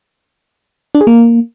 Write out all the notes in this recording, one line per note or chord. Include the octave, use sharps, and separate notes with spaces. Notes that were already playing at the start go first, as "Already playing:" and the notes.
D4
G#4
A#3